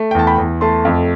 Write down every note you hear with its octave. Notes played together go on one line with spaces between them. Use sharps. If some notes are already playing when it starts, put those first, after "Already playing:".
Already playing: A3
G5
E2 A5
G5 B5
E2
A3 A5 C6
F2